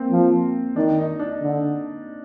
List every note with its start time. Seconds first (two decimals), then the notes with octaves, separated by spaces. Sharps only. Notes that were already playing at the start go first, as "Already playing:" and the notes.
Already playing: A#3 C4
0.11 F3
0.76 D#3 D4
0.98 D#4
1.19 D4
1.41 D3